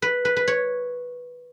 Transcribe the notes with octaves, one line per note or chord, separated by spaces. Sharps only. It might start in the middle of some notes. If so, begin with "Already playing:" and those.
B4
B4
B4
C#5